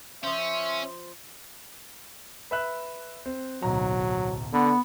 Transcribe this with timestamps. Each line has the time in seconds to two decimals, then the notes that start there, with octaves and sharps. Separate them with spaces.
0.23 F3 C#4 C5 E5
2.51 B4 E5 F#6
3.26 C4
3.63 D1 B1 F#3 A#5
4.53 D3 B3